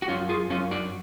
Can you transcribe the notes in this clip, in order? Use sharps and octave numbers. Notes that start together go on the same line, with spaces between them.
F#4
F#2 C#4 F4
F4 G#4
F#2 C#4 F4
D4 F#4